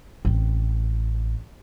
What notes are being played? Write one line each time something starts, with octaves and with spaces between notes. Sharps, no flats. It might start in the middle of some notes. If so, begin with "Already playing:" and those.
A1 C4